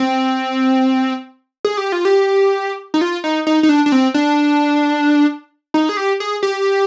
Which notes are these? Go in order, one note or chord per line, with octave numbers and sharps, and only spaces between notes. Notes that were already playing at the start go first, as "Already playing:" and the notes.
Already playing: C4
G#4
G4
F4
G4
D#4
F4
D#4
D#4
D#4
D4
D4
C4
D4
D#4
G#4
G4
G#4
G4